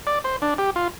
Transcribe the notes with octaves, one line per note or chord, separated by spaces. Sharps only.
D5
C5
D4
G4
F4